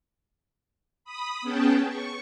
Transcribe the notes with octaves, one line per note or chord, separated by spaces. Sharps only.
B5 D#6
B3 C#4 G#4 G5 A5
C#6